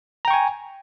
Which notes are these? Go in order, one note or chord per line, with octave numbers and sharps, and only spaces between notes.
G5 G#5 A#5 C#6